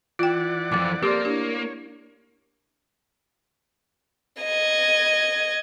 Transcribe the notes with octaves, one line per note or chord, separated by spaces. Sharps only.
E3 F4 D5 F#5 G5
C2 F2 D6 A6
A#3 C4 G4 A4 A#4 D5 C6 D6
D4 E4 G4 C#5
D#5 G#6